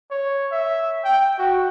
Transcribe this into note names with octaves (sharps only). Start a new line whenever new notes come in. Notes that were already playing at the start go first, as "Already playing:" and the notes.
C#5
E5
G5
F#4